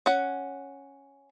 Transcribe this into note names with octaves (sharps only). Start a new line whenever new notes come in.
C#4 F#5